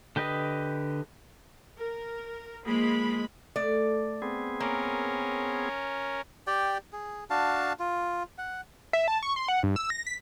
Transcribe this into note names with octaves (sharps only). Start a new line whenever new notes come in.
D3 G4 B4 D#5
A#4
F3 G#3 A#3 B5
A3 D5
B3 C4 G#4
A#3 C#4 A#4
G4 D5 G5
G#4
D4 F#4 F5 A5
F4
F#5
E5
A5
C#6
C6
F#5
G2
E6
A#6
B6